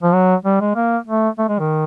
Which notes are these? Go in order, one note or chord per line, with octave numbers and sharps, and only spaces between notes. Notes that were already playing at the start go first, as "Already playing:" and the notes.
F3
F#3
G3
G#3
A#3
A3
A3
G#3
D#3